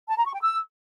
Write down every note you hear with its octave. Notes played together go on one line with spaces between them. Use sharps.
A5
A#5
C#6
G5
E6